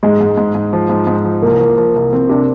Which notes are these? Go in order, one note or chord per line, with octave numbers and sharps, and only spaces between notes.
G#2 G#3
G#2
G#2
G#2
F3
G#2
G#2
F3
C2 A#3
F3
F3
C2
F3 C4
C3 D4